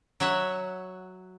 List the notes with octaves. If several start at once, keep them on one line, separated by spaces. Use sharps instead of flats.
F#3 C#5 E5 F#5